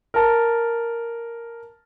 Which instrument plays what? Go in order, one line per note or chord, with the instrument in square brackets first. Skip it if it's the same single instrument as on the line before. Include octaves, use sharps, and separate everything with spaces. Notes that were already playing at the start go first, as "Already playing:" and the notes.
[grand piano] A#4 A5